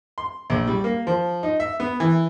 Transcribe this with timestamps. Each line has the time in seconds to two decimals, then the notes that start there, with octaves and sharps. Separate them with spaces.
0.18 C6
0.50 A#1
0.67 G3
0.84 A#3
1.07 F3
1.43 D#4
1.60 E5
1.80 B3
2.00 E3